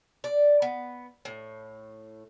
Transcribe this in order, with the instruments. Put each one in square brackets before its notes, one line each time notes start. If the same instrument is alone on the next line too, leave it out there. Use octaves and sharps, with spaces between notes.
[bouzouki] D5
B3
A2